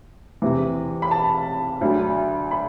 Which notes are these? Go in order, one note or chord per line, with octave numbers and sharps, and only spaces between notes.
E2 C3 E3
B5
A5
D2 D3 F#3
B5